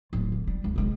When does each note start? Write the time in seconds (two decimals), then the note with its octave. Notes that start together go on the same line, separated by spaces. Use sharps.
0.13 D1 F4
0.32 D3
0.47 G3
0.64 C#2
0.76 C3 G#3